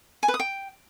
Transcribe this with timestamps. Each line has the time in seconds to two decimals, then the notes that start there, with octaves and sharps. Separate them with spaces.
0.23 G#5
0.28 B4
0.34 D#6
0.40 G5